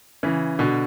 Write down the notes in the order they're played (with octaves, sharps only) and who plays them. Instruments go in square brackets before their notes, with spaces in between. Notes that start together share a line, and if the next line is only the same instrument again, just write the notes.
[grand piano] C#3 E3
B2 D3